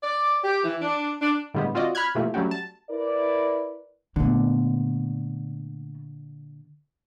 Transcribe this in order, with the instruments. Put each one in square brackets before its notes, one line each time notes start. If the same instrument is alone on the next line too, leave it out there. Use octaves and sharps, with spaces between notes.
[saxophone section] D5
G4
E3
D4
D4
[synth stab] A2 D3 G3 G#3 B3
C4 F4 F#4 D5 D#5
B5 F6 F#6 G#6
B2 E3 F3 G3 A3 A#3
F#3 G3 A3 C#4 F#4 G4
A5
[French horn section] E4 A#4 B4 D5
[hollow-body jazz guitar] A#2 D3 [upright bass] A3 B3